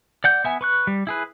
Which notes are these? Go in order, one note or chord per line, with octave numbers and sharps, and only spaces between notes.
D5 F#5 G6
B3 E5 G#5
B4 C#6 F#6
G3
E4 G#4 B4